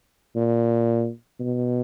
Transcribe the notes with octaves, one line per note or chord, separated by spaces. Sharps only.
A#2
B2